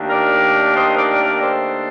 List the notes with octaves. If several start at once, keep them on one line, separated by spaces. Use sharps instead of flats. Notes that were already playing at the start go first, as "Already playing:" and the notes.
Already playing: D#2 D#3 A3 D4
A#4 D5
C5 D#5
A#4 D5
A#4 D5
A4 C5